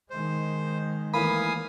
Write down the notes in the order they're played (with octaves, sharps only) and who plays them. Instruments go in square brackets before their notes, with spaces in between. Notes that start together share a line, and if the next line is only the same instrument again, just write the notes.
[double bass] D#3 G#3 [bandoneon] C5
[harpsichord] A2 E3 A#3 [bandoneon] F5 G#5 D#6 [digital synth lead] B5